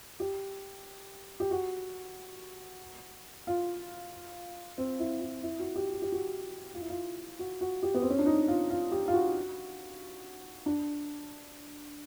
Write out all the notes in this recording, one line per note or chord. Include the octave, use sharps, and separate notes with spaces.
G4
G4
F#4
F4
C4
E4
E4
E4
F#4
G4
F#4
G4
F#4
F4
E4
F4
F#4
F#4
G4
B3
C4
C#4
D4
D#4
F4
F4
G4
F4
F#4
D4